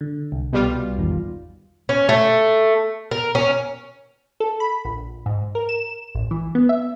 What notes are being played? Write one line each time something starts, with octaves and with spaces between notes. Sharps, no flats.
D3
C2
B2 G3 F4
G#1 E2 D#3
C#4
A3
A#4
C#4
A4
B5
A#1
G#2
A#4
E7
A1
E3
B3
E5